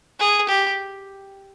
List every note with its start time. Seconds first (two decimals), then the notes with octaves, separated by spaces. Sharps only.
0.19 G#4
0.49 G4